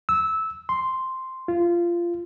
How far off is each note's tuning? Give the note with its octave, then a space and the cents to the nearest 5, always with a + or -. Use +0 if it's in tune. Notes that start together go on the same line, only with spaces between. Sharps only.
E6 -15
C6 +0
F4 -20